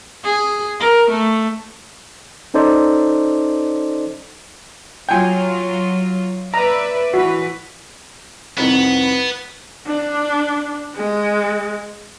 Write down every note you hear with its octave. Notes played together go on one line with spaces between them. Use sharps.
G#4
A#4
A3
C#4 D#4 A4 C5 D5
F#3 F4 G5 G#5
B4 D5 E5 A#5
E3 F#4 B4
C2 F2 D#3 B3
D4
G#3